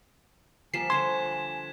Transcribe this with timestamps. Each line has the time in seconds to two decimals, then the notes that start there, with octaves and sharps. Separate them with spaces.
0.74 F3 G3 A#3 G#5 B6 C7 E7
0.90 D3 C5 C#5 C6 G#6